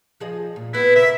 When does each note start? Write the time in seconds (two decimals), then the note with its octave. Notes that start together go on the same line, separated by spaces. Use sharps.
0.20 F3 G#4 D#5
0.56 A#2
0.73 B3 E4 B4
0.96 C#3 A#4 D#5 E5